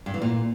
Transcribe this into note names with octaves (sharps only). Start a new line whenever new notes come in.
G2
E3
A#2